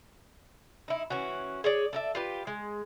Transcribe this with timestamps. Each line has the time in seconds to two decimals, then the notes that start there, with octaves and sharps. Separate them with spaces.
0.88 D#4 E4
1.10 E3 C#4 F#4
1.64 G#4 C#5 D5
1.93 A4 D5 E5
2.15 F4 G4 B4
2.47 G#3